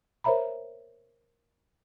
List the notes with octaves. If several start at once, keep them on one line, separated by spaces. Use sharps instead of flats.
A#4 C5 C#5 E5 A#5 B5